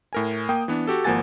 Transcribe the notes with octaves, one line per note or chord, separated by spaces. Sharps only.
A2 A#4 G#5
A#3 G5 D#6
E3 B3 D4
F#4 G4 A4
G#1 F3 A#3 F#5 G#5 A6